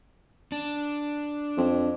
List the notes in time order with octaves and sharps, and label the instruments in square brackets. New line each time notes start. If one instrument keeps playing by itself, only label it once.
[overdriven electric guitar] D4
[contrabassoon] F2